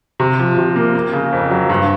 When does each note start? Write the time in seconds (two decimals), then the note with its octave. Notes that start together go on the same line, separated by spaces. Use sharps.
0.20 C3
0.39 F3
0.57 C3
0.76 A#3
0.95 A#3
1.13 C#3
1.32 F2
1.51 F#3
1.70 G2